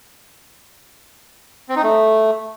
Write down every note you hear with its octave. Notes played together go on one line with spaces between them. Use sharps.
C4
D#4
A3